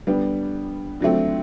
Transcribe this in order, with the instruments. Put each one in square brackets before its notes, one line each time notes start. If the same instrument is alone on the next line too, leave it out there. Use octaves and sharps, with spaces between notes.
[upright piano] D3 G3 B3
D3 F#3 A3 C4